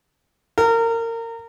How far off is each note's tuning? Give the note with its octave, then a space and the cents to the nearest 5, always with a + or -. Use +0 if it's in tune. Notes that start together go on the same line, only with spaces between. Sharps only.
A#4 -25